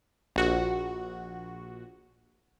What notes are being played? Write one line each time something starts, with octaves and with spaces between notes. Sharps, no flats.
A#1 F#4